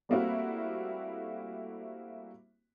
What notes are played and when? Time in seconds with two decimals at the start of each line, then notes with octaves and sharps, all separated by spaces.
0.09 G3 A3 A#3 C4 E4 F#4